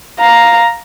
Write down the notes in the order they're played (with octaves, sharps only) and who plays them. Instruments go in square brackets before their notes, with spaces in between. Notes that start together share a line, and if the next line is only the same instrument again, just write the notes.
[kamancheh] F5 A#5